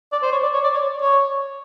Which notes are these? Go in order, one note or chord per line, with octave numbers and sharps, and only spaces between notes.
D5
C5
C#5
D5
C#5
D5
C#5
C#5